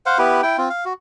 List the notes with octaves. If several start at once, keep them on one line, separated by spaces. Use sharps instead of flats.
C5 F5 F#5
B3 E4 G4 B4
E4 G5
C4 F4
F5
F#4